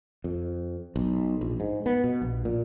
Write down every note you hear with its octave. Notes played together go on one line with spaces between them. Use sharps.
F2
B1
A#1
G#2
B3
B2
A#1
A#2